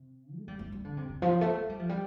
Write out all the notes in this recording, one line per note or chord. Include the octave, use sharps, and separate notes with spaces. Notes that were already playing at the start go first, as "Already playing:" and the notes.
Already playing: C3
A3
G3
A3
G3
D3
C3
C3
F3
A3
A3
G3
F3
G3